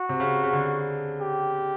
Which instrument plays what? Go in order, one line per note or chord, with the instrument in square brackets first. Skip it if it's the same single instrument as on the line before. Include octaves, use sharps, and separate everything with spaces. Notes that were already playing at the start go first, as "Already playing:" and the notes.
Already playing: [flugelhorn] F#4
[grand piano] C3
C#3
C#3
D3
[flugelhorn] G4